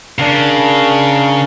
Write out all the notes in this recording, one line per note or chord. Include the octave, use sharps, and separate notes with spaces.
C#3 D4 A#4